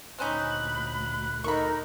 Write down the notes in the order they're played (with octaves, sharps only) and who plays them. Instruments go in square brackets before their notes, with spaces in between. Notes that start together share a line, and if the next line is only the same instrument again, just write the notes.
[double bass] D2 A#2 [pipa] C4 C#4 D#4 [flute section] B5 [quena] F#6
[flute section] D#4 A#4 D#5 [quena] A4 [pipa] B5 C#6